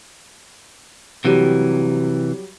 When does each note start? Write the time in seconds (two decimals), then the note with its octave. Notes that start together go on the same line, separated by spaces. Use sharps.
1.25 C3 E3 F#3 G3 G4